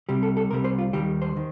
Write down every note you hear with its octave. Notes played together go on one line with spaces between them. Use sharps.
C2 C3 G3 G4
A4
A4
C2 C3 G3 A#4
C5
F4
D#2 D#3 G3 G4
C5
D#3